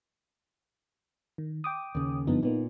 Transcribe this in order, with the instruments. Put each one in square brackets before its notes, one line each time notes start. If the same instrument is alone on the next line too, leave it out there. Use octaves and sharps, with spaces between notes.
[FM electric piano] D#3
G5 D6 D#6
[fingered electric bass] D#2 C#3
[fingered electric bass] F#1 G2 F3 [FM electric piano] D3 B3 D#4
[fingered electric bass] A#2 [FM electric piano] A#3 B3 D#4